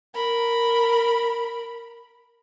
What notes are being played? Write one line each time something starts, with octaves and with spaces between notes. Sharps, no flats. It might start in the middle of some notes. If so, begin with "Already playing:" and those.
A#4 B5